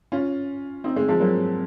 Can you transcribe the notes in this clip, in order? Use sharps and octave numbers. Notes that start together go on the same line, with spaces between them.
C#4 F4
C4 D#4
G#3 C4
F3 G#3
F#3 A#3